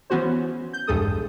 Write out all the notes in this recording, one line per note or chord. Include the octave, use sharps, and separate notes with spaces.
E3 B3 C#4 F#4 C5
G6
A#1 E2 G2 G#3 A4 D#6